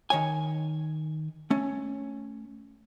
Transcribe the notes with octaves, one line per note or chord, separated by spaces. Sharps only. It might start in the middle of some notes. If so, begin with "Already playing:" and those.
D#3 C#5 G#5
A3 C#4